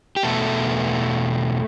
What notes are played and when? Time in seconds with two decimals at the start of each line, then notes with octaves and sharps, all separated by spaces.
0.16 G4
0.23 E2 B2 A3 B3 A4